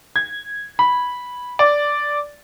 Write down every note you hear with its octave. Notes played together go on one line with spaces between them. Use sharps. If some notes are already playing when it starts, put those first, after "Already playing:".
G#6
B5
D5